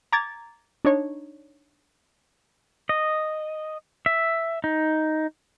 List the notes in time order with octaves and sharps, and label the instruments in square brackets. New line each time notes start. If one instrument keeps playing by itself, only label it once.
[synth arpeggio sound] A#5 D6 G#6 A6
D4 D#4 C#5
[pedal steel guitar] D#5
E5
D#4